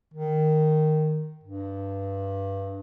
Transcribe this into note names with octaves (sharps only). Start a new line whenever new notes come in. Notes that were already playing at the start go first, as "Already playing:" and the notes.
D#3
G2